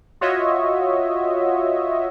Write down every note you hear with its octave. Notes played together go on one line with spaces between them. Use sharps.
F4 F#4 C#5 D#5 E5